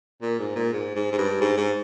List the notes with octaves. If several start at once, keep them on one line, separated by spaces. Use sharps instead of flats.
A#2
G#2
A#2
G#2
G#2
G#2
G2
G#2
G#2